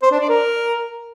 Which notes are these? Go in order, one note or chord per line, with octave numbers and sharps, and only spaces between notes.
C5
D4
D5
A#4